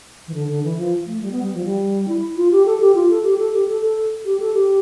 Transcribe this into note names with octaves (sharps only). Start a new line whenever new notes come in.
E3
D3
D3
E3
F3
A3
G3
B3
G3
F3
G3
E4
F4
G4
A4
G4
F4
A4
G4
A4
G4
A4
A4
G4
A4
G4